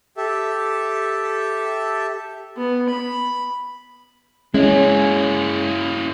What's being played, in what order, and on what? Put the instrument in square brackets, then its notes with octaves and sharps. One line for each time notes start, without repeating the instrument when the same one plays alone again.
[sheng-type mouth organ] G4 A4 E5
[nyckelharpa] B3
B5
[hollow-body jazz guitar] G#3 [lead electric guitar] A#3 E4 [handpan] C#4